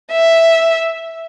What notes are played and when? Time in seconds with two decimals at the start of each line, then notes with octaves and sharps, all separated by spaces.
0.11 E5